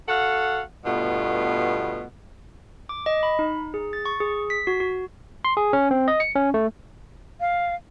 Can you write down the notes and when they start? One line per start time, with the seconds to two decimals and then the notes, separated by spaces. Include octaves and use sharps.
0.08 F#4 A4 F5 F#5
0.85 G2 B2 A3 B3 F4
2.89 D6
3.06 D#5
3.23 B5
3.39 D#4
3.74 G#4
3.93 A6
4.05 C#6
4.20 G#4
4.50 B6
4.67 F#4
4.80 F#4
5.45 C6
5.57 G#4
5.73 C#4
5.91 C4
6.08 D#5
6.20 C#7
6.35 C#4
6.54 A3
7.40 F5